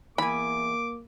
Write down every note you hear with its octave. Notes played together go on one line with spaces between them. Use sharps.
E2 A#3 G#5 B5 D6